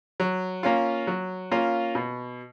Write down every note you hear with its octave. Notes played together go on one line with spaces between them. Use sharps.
F#3
A#3 C#4 F4
F#3
A#3 C#4 F4
B2